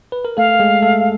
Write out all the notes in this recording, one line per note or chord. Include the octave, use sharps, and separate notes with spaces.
B4
A#4
A3 A4 F5
G#3 G#4
A3 A4